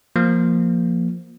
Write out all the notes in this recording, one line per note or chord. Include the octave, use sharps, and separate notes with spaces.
F3 A#3